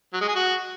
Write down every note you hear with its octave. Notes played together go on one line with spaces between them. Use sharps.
F#3
G#3
G#4
F#4